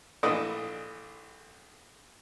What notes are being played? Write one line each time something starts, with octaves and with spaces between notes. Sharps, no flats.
A#1 E3 A3 D5 D#5